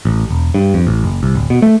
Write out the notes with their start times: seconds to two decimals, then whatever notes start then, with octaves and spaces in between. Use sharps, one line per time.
0.05 A1
0.30 E1
0.54 G2
0.74 F2
0.87 A1
1.04 F#1
1.23 C2
1.35 D1
1.50 B2
1.62 A3